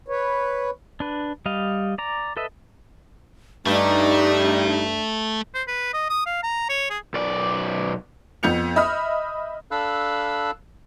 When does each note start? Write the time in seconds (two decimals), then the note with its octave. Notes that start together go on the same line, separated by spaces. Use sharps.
0.08 B4 C#5
1.00 D4 B4
1.46 G3 D#5 F5
1.98 D5 A#5
2.37 A4 B4 D#5 E5
3.66 G2 A3 D4 D#4
5.55 C5
5.68 B4
5.94 D#5
6.10 D#6
6.26 F5
6.43 A#5
6.70 C#5
6.90 G#4
7.14 B1 D5
8.43 F2 B3 G6 C#7 F7
8.76 D#5 E5 B5 D#6 F6
9.71 D4 A4 F5 B5 E6 F#6